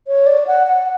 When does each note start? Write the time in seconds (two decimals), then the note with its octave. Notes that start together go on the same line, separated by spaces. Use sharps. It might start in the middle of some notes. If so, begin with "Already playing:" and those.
0.07 C#5
0.27 D5
0.47 F#5
0.67 F#5